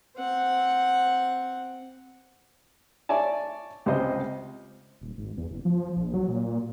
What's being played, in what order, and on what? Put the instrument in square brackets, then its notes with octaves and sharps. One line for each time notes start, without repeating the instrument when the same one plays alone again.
[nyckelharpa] C4 F#5
[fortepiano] C#5 D5 E5 G#5 A5
C#2 C3 C5 D#5
[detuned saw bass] D#1
G#1
E2
F#1
F3
A#1
F#3
A#2